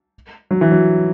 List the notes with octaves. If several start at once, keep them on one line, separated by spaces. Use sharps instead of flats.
F#3
E3
F#3